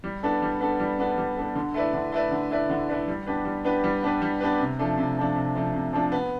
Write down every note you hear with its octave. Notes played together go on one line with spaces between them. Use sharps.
G3
B3 D4 A4
G3
B3 D4 A4
G3
B3 D4 A4
G3
B3 D4 A4
D3
A3 E4 B4 D5
D3
A3 E4 B4 D5
D3
A3 E4 B4 D5
D3
A3 E4 B4 D5
G3
B3 D4 G4 B4
G3
B3 D4 G4 B4
G3
B3 D4 G4 B4
G3
B3 D4 G4 B4
C3
F3 A3 D4
C3
F3 A3 D4
C3
F3 A3 D4
C3
F3 A3 D4
B3